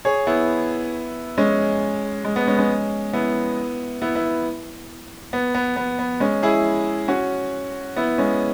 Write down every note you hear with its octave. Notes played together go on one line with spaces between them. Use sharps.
G#4 C#5
B3 E4
G#3 C#4
G#3
B3
G#3 C#4
G#3 C#4
B3 E4
B3 E4
B3 E4
B3
B3
B3
B3
G#3 C#4
E4 G#4
C#4 F#4
B3 E4
G#3 C#4